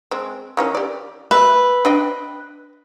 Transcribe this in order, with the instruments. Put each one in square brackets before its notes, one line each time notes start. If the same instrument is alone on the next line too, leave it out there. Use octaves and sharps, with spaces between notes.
[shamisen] G#3 C4
D#3 E3 C#4
G4 D5
[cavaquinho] B4 [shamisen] E5
[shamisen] D4 D#5 G5